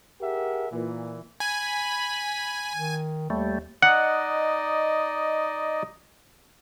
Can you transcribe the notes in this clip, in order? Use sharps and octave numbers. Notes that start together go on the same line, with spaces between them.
G4 G#4 A#4 E5 F#5
A#2 E3
G#5 B5
D#3
D#2 G3 A3
D#4 D5 D#5 F#5